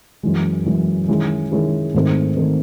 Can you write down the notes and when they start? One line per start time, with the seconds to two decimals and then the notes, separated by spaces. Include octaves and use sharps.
0.23 F#2 E3 G#3
0.66 F#2 E3 G#3
1.08 D#3 G#3 C#4 E4 G#4
1.52 D#3 G#3 C#4 E4 G#4
1.94 G#2 D#3 A3 C4
2.36 D#3 A3 C4